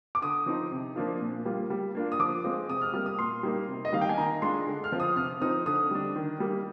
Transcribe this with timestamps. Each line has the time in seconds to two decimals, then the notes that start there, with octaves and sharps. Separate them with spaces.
0.15 D6
0.22 D3 D#6
0.46 F3 C4 D#4
0.72 C3
0.96 F3 A#3 D4 F4
1.21 A#2
1.45 G3 A#3 F4
1.70 G3
1.95 A#3 D4 F4
2.12 D#6
2.19 F3 D6
2.44 G#3 C4 F4
2.69 C3 D#6
2.81 F6
2.93 G3 A#3 F6
3.06 D#6
3.19 A#2 C6
3.43 G3 A#3 D#4
3.68 C3
3.85 D#5
3.92 D#3 G3 A#3 D#4 F5
4.01 G5
4.09 G#5
4.18 D#3 A#5
4.42 G#3 D4 F4 C6
4.67 D3
4.84 F6
4.92 F3 C4 F4
5.00 D#6
5.16 C3 F6
5.41 F3 C4 D#4 D#6
5.66 D3 D#6
5.91 G3 D4
6.16 D#3
6.40 G3 A#3